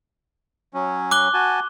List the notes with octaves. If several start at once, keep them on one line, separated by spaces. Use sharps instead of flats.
F#3 C#4
D6 F#6 G7
F#4 G#5 A5